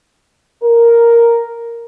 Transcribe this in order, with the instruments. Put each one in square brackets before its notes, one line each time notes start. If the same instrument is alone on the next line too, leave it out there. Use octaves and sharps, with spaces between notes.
[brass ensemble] A#4